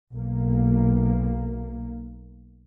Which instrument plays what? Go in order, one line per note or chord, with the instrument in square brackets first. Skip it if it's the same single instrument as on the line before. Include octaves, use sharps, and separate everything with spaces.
[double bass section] B1 A#3